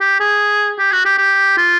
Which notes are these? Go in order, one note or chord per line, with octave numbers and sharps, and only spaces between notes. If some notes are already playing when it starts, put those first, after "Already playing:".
G4
G#4
G4
F#4
G4
G4
F4